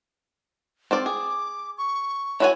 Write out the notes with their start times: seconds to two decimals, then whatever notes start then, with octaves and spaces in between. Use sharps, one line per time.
0.91 C4 F4 D5
1.06 G#4 D6
1.78 C#6
2.40 E4 F#4 C#5 G#5